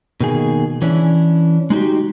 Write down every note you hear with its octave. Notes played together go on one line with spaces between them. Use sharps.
B2 D#3 A#3 G#4
E3 C#4 D4 E4
G#3 D#4 F#4 G4